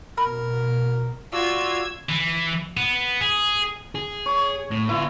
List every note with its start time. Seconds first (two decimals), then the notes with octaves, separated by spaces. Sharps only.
0.18 B2 A#4 B5
1.33 F4 F#4 D5 E6 G#6
2.09 E3
2.77 B3
3.21 G#4
3.95 G#4
4.26 C#5
4.71 A2
4.89 B3 E4 F4